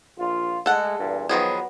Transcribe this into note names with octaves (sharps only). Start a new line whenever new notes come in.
A#1 F4
G#3 A3 A4 F#5
E2 G2 A#2
D#3 F3 F#3 B3 G#4